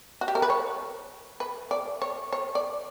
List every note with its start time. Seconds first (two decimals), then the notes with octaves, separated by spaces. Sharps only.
0.21 F#4
0.28 G4
0.35 A#4
0.42 B4
0.50 C#5
1.40 B4
1.71 D5
2.02 C#5
2.33 C#5
2.55 D5